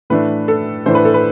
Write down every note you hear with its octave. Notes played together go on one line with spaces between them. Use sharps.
A2 E3 A3 D4 B4
A4
A2 E3 A3 D4 C5
B4
A4
B4